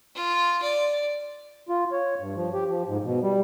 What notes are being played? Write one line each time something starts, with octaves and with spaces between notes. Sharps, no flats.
F4
D5
F4
C#5
G2
F3
G4
F3
G#2
B2
G3